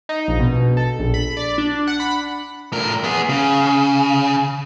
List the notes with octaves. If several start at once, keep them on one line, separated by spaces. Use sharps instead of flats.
D#4
A#1
B2
A4
A#1
B5
D5
D4
F#5
B5
A2 A#4
B3 G#4
C#3